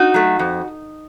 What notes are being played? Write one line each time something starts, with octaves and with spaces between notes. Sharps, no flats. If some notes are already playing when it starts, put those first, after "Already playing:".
Already playing: D#4 F#4
F#3 A3
F2